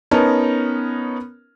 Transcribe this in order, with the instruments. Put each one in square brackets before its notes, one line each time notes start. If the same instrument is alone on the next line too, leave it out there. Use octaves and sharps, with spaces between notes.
[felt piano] B3 C#4 D#4 A#4 A5